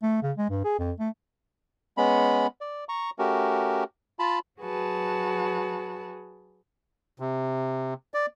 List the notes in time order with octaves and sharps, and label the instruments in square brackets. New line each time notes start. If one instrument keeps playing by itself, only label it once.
[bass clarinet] A3
C#3
G#3
G2
G#4
F2
A3
[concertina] G#3 B3 C#4 B5
D5
A#5 C#6
A3 C#4 F#4 G4 A#4
F4 A5 B5
[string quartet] F#3 F#4 G#4 B4 A5
[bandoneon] C3
D5